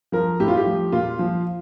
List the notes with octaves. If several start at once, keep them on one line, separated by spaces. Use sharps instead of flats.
F3 A#4
A2 G4
F4
G4
F3
A#2 F4
F3